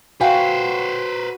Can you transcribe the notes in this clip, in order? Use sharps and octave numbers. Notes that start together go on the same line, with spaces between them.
F#4 B4 C5 F5 G5 G#5